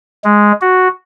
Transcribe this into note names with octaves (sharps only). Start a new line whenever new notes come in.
G#3
F#4